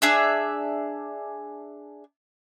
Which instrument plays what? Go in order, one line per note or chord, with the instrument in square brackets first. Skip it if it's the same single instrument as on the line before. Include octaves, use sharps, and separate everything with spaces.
[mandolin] D4 G#4 E5